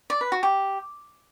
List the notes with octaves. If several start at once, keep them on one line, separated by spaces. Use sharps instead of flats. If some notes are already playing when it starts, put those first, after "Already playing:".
D5
B4
F#4
G4